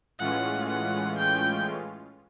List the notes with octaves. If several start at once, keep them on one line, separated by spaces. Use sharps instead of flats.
A2 E3 G#3 C#4 F4 F#5
F#5
G5